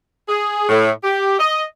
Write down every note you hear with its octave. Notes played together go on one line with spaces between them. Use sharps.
G#4
A2
G4
D#5